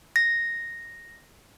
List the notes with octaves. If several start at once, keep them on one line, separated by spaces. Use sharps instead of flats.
A#6